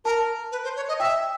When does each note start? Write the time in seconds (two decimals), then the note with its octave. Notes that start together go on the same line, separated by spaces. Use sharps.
0.05 A#4 A5
0.52 B4
0.64 C5
0.76 C#5
0.88 D#5
0.99 E5 G5